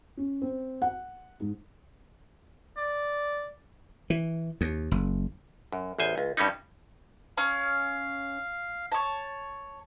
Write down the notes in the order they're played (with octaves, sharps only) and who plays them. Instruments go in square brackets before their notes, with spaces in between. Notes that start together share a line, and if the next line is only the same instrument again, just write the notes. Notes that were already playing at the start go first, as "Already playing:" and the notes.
[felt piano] C#4
C4
F#5
G#2
[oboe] D5
[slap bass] E3
D#2
F#1
[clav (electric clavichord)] F#2
A1 E2 C5 G#5
C#2
G2 G3 C#4 D#4
[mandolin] C#4 [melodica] F5
[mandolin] C#5 A5